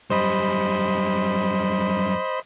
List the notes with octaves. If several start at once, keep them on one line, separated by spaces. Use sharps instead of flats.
F#2 G3 C5 D#5 B5